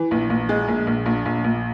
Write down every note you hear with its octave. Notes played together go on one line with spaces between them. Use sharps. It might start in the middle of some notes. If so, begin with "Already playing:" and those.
Already playing: E3
A#1
A#1
G#3
A#1
A#1
A#1
A#1
A#1